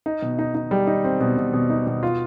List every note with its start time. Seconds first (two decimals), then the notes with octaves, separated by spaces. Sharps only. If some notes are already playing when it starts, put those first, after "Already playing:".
0.06 D#4
0.22 B2
0.39 D#4
0.55 D#4
0.71 G3
0.87 D#4
1.04 C4
1.20 B2
1.37 B2
1.53 B2
1.70 D#4
1.87 B2
2.03 F4